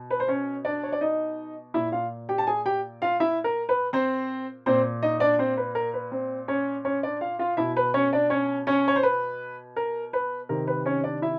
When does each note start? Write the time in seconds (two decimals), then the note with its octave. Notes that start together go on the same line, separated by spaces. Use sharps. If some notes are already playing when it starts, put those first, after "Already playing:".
Already playing: B2
0.10 B4
0.20 C5
0.28 C#4 C#5
0.65 D4 D5
0.83 C#5
0.92 D5
1.01 D#4 D#5
1.74 A#2 E4 E5
1.92 F4 F5
2.29 G4 G5
2.38 A5
2.47 G#4 G#5
2.66 G4 G5
3.02 F4 F5
3.20 E4 E5
3.44 A#4
3.69 B4
3.93 C4 C5
4.66 A#2 C4 C5
5.03 D#4 D#5
5.20 D4 D5
5.39 C4 C5
5.57 B4
5.75 A#4
5.94 B4
6.12 C4 C5
6.48 C#4 C#5
6.85 C#4 C#5
7.03 D4 D5
7.21 F4 F5
7.39 F4 F5
7.57 B2 E4 E5
7.76 B4
7.94 C#4 C#5
8.13 D4 D5
8.30 C#4 C#5
8.67 C#4 C#5
8.88 C#5
8.96 C5
9.03 B4
9.76 A#4
10.13 B4
10.49 C3 D#3 A#4
10.67 B4
10.86 C#4 C#5
11.04 D4 D5
11.22 E4 E5